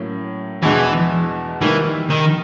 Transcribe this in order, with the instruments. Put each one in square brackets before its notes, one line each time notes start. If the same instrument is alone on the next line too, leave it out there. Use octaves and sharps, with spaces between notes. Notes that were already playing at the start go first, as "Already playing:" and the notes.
Already playing: [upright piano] A2 F#3 A#3 C#4
[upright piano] E2 B2 G#3 B3 D4 [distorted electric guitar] E3
[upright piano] D#3 G3 A#3 [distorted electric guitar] E3
[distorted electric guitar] D#3